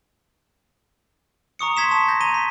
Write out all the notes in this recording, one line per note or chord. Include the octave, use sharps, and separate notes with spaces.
A#5 C#6 D#6 C#7
C6 G#6 B6 E7
A5 E7
G6 A#6
A#5 D#7 G7
B6